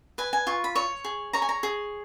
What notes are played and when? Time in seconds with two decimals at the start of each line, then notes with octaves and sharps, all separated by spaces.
0.18 B4 G#5
0.33 G#5
0.47 F4 C#6
0.64 B5
0.75 C#5 C#6
1.05 G#4
1.33 C#5 A#5
1.42 G#5
1.49 A#5
1.63 G#4